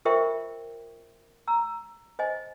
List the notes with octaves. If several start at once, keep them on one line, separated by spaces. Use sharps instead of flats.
F4 A#4 C5 E5 G5 C#6
A#5 E6
C5 D#5 G#5